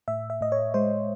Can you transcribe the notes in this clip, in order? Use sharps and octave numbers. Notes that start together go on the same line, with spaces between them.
A2 E5
E5
A2 D#5
C#5
G#3 C5